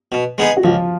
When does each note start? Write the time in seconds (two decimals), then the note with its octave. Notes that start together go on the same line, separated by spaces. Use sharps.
0.12 B2
0.38 G#3 B3 D#4 G#4
0.57 F#4
0.64 C#2 F3 F4